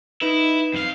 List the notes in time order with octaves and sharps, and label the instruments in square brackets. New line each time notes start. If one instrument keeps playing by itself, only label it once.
[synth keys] D#4 B4 [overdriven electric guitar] E4
[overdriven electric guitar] F2 F5